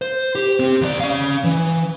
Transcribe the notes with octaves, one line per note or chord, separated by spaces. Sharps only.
C5
G4
C4 G4
D#2 D5
C#4 F5
E3